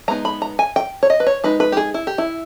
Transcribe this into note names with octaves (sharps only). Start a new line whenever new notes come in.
G#3 B3 D#4 A#5
B5
A#5
G#5
G5
C#5
D#5
B4
C#5
G#3 D#4 B4
B4
G4
G#4
E4
G4
E4